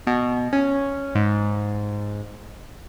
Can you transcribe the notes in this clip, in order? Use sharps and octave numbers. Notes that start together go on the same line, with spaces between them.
B2
C#4
G#2